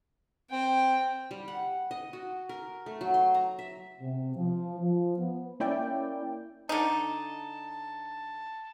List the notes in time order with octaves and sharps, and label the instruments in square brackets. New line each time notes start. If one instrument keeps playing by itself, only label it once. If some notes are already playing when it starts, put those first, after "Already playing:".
[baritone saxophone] C4 [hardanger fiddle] G5
[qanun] G3
F#5
D#5
F#4
A#4
A3
F#3
C6
A#5
E5
[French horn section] C3
F3
F3
B3
[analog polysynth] A#3 C#4 E4 D5 G5
[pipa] D3 D#4 [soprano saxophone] A5